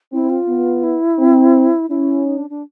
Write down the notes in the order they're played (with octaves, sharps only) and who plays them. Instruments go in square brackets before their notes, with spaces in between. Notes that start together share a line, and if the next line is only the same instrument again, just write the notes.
[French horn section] C4 [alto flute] E4
[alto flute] F4
[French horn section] B3
[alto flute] E4
[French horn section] C4
[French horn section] C#4 [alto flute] E4
[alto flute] D#4
D4
D4